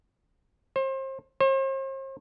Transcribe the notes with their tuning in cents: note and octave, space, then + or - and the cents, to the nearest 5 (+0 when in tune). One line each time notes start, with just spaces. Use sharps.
C5 +35
C5 +45